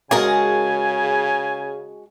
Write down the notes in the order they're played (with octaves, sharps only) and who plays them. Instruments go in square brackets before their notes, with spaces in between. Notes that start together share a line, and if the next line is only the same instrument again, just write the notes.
[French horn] C#3 [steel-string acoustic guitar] G#3 F#4 A5 [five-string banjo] G#4 A#4 [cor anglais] G#5